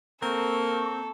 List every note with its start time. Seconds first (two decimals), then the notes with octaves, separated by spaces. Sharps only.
0.22 A#3 C4 A4 C#6